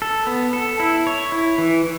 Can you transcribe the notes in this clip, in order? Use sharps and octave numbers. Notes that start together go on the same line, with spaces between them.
A4
B3
A4
E4
C#5
E4
E3